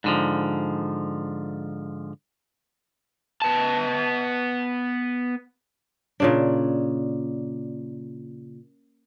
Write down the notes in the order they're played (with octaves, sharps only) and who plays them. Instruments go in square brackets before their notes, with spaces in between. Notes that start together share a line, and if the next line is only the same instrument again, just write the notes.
[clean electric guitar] G#2 D3 F3
[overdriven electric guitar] B3 A5
[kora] A#2 C#3 D4